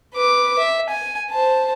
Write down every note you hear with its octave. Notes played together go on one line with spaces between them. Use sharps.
B4 D6
E5
G#5
C5 A5